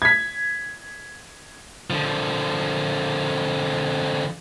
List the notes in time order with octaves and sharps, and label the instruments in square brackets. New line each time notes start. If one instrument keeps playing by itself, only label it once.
[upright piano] G#6 B6
[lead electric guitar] D3 F3